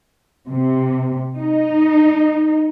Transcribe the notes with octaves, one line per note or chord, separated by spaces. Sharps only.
C3
D#4